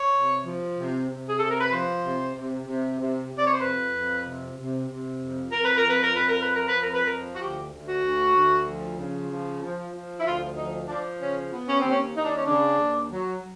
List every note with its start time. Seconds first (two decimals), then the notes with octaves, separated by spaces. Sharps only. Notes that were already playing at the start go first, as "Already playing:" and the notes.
Already playing: C#5
0.15 C3
0.46 F3
0.77 C3
1.08 C3
1.29 G#4
1.39 C3 A4
1.50 A#4
1.61 B4
1.72 F3 C5
2.04 C3
2.35 C3
2.66 C3
2.99 C3
3.31 C3
3.38 D5
3.46 C#5
3.54 C5
3.61 F2 B4
3.93 F2
4.25 C3
4.57 C3
4.88 C3
5.20 F2
5.51 F2 A#4
5.64 B4
5.78 F2 A#4
5.90 B4
6.03 A#4
6.14 F2 B4
6.29 A#4
6.42 F3 B4
6.55 A#4
6.68 B4
6.78 F2 A#4
6.94 B4
7.07 F3 A#4
7.36 F#4
7.41 D2 G4
7.72 D2
7.88 F#4
8.04 D2
8.36 D2
8.68 F3
8.99 C#3
9.30 F3
9.62 F3
9.94 F3
10.20 E4
10.26 D2 F4
10.58 F3 D#4
10.89 F3 D4
11.21 C#3 C#4
11.51 B3
11.68 C#4
11.80 D#2 C4
11.91 C#4
12.16 D#2 D#4
12.25 D4
12.36 C#4
12.46 C#3 D4
12.78 D#2
13.10 F#3